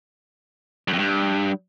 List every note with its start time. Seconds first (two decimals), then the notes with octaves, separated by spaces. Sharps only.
0.88 F#2
0.93 F2
0.99 G2